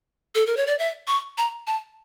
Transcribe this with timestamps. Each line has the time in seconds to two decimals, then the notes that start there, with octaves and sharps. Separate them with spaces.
0.35 A4
0.46 A#4
0.57 C#5
0.67 D5
0.78 E5
1.07 C#6
1.37 A#5
1.67 A5